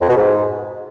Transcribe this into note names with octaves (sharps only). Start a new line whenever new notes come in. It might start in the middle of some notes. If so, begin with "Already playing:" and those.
F2
B2
G#2